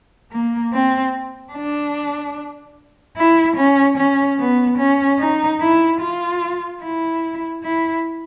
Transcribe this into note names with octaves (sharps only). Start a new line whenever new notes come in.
A#3
C4
D4
E4
C#4
C#4
B3
C#4
D#4
E4
F4
E4
E4